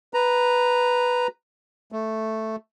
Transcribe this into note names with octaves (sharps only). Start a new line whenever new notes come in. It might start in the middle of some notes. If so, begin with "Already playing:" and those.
B4 A#5
A3